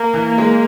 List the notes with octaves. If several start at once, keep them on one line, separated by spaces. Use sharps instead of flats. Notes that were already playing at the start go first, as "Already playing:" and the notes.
Already playing: A#3
E3
G#3